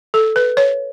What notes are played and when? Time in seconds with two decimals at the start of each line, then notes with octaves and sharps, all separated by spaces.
0.14 A4
0.36 B4
0.57 C#5